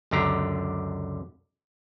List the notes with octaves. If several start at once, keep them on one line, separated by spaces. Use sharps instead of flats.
C#2 F#2 D3 G4 A#5